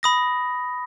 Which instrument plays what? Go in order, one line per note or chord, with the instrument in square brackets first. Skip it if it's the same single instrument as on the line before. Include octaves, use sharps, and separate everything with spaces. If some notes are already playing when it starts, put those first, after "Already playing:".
[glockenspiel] B5 D#6 A#6